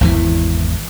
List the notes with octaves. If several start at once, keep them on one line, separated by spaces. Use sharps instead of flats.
G#1 E2 E3